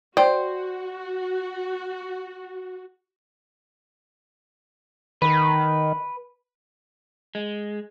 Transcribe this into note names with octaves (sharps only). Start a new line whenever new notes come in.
F#4 C5 D5 G5
D#3 B4
G#3